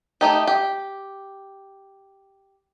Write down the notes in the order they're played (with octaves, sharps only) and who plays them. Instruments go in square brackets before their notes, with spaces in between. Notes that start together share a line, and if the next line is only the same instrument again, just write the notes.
[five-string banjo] A3 D#4 G4
G4